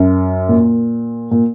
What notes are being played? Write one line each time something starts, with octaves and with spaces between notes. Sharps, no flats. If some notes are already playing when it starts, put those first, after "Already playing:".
Already playing: F#2
A#2
A#2